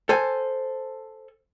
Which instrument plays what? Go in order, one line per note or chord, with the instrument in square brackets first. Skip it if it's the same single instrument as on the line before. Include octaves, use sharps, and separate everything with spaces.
[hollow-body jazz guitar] A4 C5 G#5